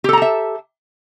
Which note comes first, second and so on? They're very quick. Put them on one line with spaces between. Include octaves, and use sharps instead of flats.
G4 A4 A#5 A5 E5